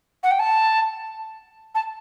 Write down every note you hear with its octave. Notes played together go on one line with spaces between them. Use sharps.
F#5
G5
A5
A5